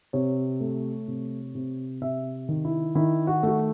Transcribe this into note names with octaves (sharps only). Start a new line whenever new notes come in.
C3 C#5
A3
C3
C3
C3 E5
D#3
E4
D#3 E4
F#4
A3 F#4